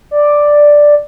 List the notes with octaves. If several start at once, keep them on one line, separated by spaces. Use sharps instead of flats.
D5